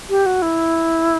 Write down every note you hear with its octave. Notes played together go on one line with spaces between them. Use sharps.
G4
F#4
E4